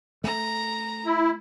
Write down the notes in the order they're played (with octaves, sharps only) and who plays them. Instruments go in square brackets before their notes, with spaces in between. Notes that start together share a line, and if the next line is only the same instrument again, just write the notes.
[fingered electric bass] A3 [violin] A#5
[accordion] E4